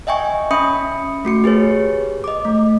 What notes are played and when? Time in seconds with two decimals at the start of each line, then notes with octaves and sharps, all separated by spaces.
0.07 D#5 E5 G5 G#5 C#6
0.51 C#4 E5 B5 D#6 C#7
1.25 A3 F#4 C#7
1.44 G4 G#4 B4 C#5
2.24 D#5 D6
2.45 A3